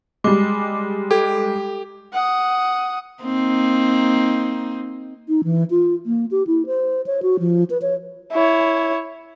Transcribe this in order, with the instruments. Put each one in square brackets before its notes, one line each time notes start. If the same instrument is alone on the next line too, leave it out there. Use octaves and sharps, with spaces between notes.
[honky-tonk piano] G3 G#3 [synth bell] D6
[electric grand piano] G4 [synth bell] A4
[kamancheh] F#5 D#6
[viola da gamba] A#3 C4 D#4
[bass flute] D#4
E3
F4
A#3
G4
E4
C5
C#5
F#4
F3
B4
C#5
[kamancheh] E4 C#5